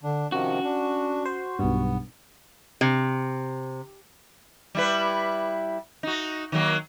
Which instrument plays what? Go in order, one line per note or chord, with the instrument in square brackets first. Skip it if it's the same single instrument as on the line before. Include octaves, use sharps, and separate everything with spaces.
[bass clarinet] D3 [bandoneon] D4
[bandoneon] C3 D#3 F3 [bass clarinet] C#4 [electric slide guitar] F#4
[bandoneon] D4
[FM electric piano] C5
[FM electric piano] B1 G2 [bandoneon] B3
[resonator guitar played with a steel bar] C3
[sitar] G3 E4 B4
D#4 F#4
D#3 F#3 A#3